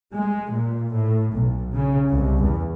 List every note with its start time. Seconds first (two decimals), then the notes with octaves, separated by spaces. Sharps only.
0.14 G#3
0.52 A#2
0.94 A2
1.35 B1
1.74 C#3
2.10 C2
2.42 E2